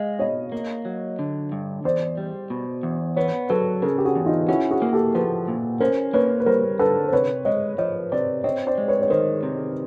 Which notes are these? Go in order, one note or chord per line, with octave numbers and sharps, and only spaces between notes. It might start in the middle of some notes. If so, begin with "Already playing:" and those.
Already playing: G#3 D#5 F5
B2 C#5 D#5
A#3
F#3
D3
G2
E2 C5 D5
G3
B2
E2
B3 B4 C#5
F#3 A4 B4
C#3 G#4 A#4
G4
F#4 G#4
E2
D#4 F4
C#4 E4 F#4
F#4 G#4
A#3
G4 A4
F3 A4 B4
A#2
C#4 A#4 C5
A#3 B4 C#5
B4
G3 A#4 C5
D3 A4 B4
C5
C3 B4 C#5
G#3 C#5 D#5
F3 C#5 D#5
C3 C5 D5
C4 C#5 D#5
C5 D5
G#3
B4 C#5
C#5
D#3 A#4 C5
C3